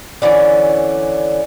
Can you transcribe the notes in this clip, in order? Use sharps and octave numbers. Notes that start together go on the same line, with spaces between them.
D3 E3 A3 C#4